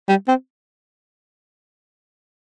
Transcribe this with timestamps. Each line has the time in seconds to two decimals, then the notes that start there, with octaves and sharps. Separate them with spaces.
0.09 G3
0.28 C4